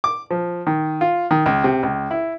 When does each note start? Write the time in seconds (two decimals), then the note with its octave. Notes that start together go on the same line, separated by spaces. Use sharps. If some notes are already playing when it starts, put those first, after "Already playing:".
0.04 D6
0.31 F3
0.67 D#3
1.01 F4
1.31 D#3
1.46 C#2
1.64 C3
1.83 C#2
2.11 E4